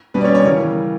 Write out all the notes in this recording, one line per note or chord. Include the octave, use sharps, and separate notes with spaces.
B2 G3 B4
D5
C#4 C#5
C#4 C#5
C#3 E3 G3 A#4